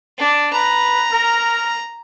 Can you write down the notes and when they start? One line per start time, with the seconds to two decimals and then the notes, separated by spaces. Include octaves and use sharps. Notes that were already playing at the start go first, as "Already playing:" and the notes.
0.18 D4
0.53 B4 A#5
1.12 A#4